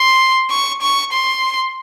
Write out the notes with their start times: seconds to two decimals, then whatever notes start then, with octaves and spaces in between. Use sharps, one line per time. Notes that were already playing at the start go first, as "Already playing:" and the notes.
Already playing: C6
0.50 C#6
0.82 C#6
1.13 C6